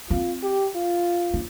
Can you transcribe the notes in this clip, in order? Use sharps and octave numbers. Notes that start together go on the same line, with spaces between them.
C4 F4
G4
F4
D#4